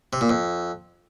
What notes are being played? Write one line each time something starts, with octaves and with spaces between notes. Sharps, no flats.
C3
A#2
F2